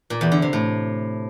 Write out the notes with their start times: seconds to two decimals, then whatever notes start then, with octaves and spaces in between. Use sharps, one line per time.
0.10 A#2
0.21 E2
0.32 D3
0.42 C3
0.53 A2